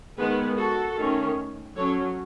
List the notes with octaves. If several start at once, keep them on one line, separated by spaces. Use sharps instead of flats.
D#3 G#3 B3 G#4 B4
F#4 A4
D#3 A3 C#4
F#3 C#4 A4 C#5